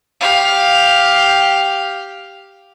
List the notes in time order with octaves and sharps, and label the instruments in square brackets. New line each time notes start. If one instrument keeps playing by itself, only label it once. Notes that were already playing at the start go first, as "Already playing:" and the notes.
[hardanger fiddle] G4 F5